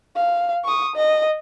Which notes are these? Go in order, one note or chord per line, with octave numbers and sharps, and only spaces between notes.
F5
C#6 D#6
D#5